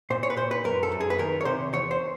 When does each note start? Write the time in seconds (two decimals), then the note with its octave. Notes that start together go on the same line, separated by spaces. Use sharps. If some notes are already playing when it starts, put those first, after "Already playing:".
0.10 A#2 C5
0.23 C#5
0.30 B4
0.36 A#2 C5
0.51 B4
0.64 F#2 A#4
0.83 A4
0.92 F#2
1.00 G#4
1.10 B4
1.18 D#3 A#4
1.41 C#5
1.45 C3 C5
1.73 E2 C#5
1.91 C5